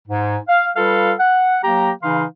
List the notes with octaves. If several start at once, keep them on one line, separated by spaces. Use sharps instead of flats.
G#2
F5
G3 F4 A4 B4 F5
F#5
F#3 A#3 G4 A#5
C#3 E3 D#4 F5 C6